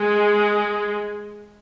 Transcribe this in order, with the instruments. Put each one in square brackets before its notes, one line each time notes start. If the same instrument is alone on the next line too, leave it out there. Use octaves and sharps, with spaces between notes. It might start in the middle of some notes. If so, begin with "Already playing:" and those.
Already playing: [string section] G#3